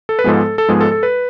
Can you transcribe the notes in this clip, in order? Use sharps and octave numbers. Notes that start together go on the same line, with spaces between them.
A4
B4
G#2 F3 G#3 B3 A4
A4
G#2 F3 G#3 B3 G#4
A4
A4
B4